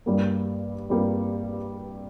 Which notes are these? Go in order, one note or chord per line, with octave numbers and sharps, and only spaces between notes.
G2 G3 A#3
G2 G3 A#3